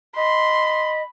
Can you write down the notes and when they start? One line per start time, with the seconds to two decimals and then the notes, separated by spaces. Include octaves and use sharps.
0.17 D#5 B5 C6